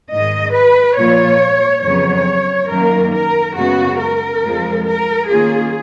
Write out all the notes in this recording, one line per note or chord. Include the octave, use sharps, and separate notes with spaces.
G#2 D#3 G#3 D#5
B4
A#2 F3 A#3 F4 C#5
F2 C#3 F#3 B3 C#5
F#2 D#3 A#3 A#4
A#4
F#2 C#3 G#3 B3 F#4
A#4
F2 F3 G#3
A#4
D#3 A#3 C#4 F4 G#4